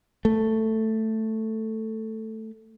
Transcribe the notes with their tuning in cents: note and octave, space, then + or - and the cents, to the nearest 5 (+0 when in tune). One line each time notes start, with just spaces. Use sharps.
A3 +5